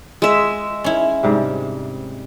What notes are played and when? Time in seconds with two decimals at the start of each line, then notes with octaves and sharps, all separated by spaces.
0.22 G#3 E5
0.84 C#4 E4
1.23 G#2 C3 G3